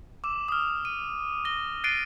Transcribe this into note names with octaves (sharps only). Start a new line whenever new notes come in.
D6 E6 E7
D#6 F6
D#7
A#6 G7
F#6 A6 C7 D7 D#7 G7